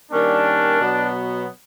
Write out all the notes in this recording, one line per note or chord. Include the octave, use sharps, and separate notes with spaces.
D#3 G3 A#3 C#4 D4
B2 F#3 B3